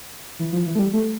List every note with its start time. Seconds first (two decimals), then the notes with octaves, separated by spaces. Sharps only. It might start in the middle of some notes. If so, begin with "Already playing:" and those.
0.39 E3
0.52 F3
0.66 E3
0.75 A3
0.79 G3
0.93 A3